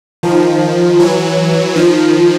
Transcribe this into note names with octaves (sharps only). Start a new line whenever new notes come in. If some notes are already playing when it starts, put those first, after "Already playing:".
D#3 F3
E3 F#3
D#3 F3